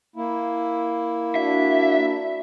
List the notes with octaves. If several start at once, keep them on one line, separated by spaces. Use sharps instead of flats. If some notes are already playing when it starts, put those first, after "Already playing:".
A#3 E4
D4 F#4 E5